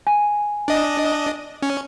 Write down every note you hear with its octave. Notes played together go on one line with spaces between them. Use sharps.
G#5
D4 D#5
C#4